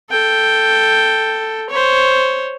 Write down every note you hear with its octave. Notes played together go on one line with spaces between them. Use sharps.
A4 G5
C5 C#5